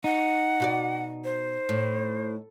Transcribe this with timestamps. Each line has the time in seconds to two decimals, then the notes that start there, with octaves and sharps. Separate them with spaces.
0.04 D#4 F#5
0.60 B2 F#4 D5
1.24 C5
1.69 A2